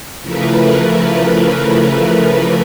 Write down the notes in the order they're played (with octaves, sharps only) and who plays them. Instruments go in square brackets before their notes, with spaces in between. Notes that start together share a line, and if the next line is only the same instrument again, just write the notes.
[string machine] C#3 E3 F3 A3 A#4 B4